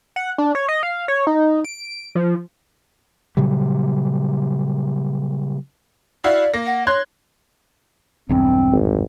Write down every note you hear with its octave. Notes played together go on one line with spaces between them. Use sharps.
F#5
D4
C#5
D#5
F5
C#5
D#4
D7
F3
A#2 C#3 F#3 G3
E4 F#4 D5 F5
A#3 A#6
F#5
C#5 C6 F#6 G#6
B1 E2 G2 C4
G#1